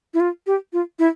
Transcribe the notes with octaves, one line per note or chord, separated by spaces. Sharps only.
E4
F4
G4
F4
E4